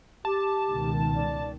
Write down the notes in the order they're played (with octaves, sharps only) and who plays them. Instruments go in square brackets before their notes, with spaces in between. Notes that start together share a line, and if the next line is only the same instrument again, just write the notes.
[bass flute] G4 [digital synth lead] A5
[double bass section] C#2 B2 D#3
[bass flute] D5